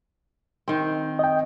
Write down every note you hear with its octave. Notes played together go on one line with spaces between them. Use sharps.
D#3 C4
D#5 G5